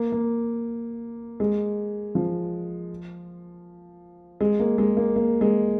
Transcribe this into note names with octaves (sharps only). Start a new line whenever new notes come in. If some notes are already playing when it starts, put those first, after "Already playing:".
Already playing: A#3
A#3
G#3
F3
G#3
A#3
G#3
A#3
A#3
G#3